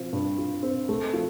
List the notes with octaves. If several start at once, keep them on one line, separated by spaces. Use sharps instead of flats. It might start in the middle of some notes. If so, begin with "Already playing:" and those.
Already playing: F3 C4
G2
F4
C4
A3
F3